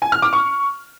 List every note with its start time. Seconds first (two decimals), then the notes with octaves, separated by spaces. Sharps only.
0.02 G#5
0.12 F6
0.22 D6
0.33 C#6